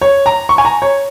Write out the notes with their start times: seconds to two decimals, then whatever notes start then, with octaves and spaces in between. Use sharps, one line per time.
0.01 C#5
0.26 A#5
0.49 C#6
0.58 G#5
0.65 A#5
0.82 C#5